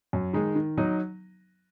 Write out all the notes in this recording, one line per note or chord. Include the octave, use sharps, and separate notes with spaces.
F#2
D#3 G#3 D#4
D#3
F#3 D#4